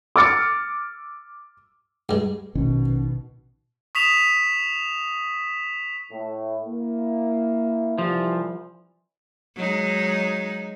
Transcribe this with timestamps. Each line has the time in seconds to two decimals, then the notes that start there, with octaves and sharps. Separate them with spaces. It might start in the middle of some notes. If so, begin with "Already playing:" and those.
0.16 D6 E6 F6 A6 C#7
2.09 G2 G#3
2.55 A#1 B2 D#3 C#4
3.95 C#6 D#6 B6 E7 F7
6.12 A2
6.66 A#3 E4
7.98 C2 C3 E3 F3
9.56 F#3 G#3 D#4